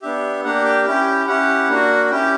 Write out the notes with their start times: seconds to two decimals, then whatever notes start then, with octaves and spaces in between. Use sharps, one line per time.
0.02 B3 D4 G4 E5
0.44 A#3 D4 G4 F#5
0.65 G5
0.86 C#4 E4 G4 G5
1.27 C#4 E4 G4 F#5
1.69 A#3 D4 F#4
2.11 C#4 E4 G4 G5